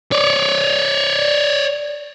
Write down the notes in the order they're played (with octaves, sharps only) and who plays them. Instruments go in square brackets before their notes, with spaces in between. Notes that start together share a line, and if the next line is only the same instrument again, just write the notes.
[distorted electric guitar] C#5 D5